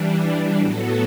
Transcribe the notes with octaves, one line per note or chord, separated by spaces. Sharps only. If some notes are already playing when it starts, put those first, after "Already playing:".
Already playing: E3 G3 D4
A2 F#3 B3 F#4 A4